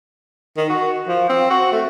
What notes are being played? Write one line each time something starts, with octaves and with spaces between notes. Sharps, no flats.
D#3
F#4
F3
C4
F#4
A3